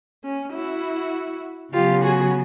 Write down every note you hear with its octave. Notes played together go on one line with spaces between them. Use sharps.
C#4
E4 F#4
C#3 F#3 B3 F4 G4
F#4 G#4